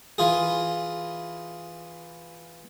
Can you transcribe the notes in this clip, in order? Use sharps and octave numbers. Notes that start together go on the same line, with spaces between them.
E3 F4 G#4